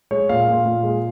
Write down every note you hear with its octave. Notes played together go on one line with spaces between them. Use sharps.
G#3 C#5
A#2 F5
A#2
A#2
G#3